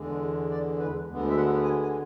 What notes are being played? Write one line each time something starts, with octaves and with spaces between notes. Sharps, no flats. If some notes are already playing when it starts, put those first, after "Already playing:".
Already playing: E2 D3 G#3
D5
B4
D2 D3 G#3 B3
E5
F#5
G#5
G#5